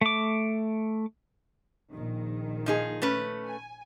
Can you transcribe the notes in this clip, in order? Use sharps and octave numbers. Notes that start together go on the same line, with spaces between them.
A3 D6
A#1 D#3
F3 D#4 G#4
A3 C#4 B4
G#5